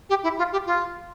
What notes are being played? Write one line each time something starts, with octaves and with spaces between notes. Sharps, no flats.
G4
E4
F4
G4
F4